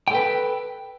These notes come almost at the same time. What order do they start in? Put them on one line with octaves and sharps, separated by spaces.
G5 A4 B4